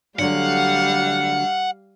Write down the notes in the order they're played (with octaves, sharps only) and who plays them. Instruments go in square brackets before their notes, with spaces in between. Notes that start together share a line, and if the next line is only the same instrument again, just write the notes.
[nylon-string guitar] D3 F#3 A3 [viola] G3 F5 [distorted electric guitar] F#5